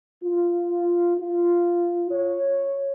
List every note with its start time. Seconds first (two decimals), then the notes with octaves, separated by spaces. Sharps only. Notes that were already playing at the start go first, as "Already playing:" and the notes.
0.23 F4
1.17 F4
2.11 C#5